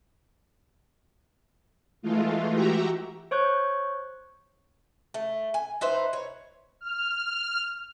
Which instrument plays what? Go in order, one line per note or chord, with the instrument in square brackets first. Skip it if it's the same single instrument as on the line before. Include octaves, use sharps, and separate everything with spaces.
[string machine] E3 G#3 A3 F4
F#4 G4 E5 A#5
[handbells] C5 C#5 C#6 F#6 G6
[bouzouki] A3
G#5
D#4 B4 C5 E5
C#5
[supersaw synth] F6